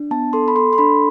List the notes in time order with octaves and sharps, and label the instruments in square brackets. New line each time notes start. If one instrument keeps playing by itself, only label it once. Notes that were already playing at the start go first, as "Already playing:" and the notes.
Already playing: [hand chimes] D4
B3 A5
A4 C6
B5
A4 C6
C6
D4 B5